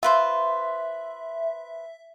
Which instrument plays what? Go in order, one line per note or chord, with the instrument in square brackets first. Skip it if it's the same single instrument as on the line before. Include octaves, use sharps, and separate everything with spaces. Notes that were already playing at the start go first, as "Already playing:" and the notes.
[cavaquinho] F4 B4 C5 [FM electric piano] E5